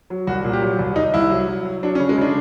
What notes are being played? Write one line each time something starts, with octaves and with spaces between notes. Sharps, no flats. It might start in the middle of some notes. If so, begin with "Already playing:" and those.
F#3
C2 F#4
A#2
G4
F#3
C2
C2 D#4
C2 E4
F#3
F#3
F#3
F#3 D4
C#4
C#3
G#3
C#3 D4